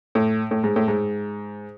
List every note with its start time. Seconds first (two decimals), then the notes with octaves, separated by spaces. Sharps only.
0.15 A2
0.51 A2
0.64 G#2
0.76 A2
0.88 G#2